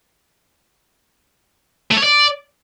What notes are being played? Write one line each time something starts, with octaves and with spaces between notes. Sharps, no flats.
A3
C#5
D5